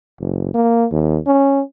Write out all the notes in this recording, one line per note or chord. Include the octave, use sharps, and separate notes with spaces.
F#1
A#3
D#2
C#4